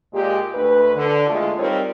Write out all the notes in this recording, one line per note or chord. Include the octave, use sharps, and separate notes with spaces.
A#2 G#3 G4
D2 B4
D3
E2 G#3 A3 F4
G3 C4 D#4 F4 A#4 C#5